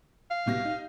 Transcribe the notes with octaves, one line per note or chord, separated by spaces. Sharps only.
F5
C2 B2 A#6
D#4